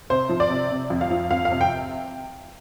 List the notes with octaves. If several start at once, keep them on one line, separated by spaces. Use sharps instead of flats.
C3 C5
F3
D5
C3
C3
F2
F5
F3
F2 F5
F5
C3
G5